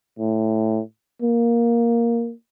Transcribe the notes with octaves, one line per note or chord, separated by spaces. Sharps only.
A2
A#3